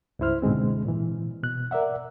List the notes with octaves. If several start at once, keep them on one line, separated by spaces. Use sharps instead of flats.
C#2 G2 E4 C5 F6
G#2 B2 D3 G#3 C4
A#2 E3
B2 F#6
A#4 D5 E5 F#5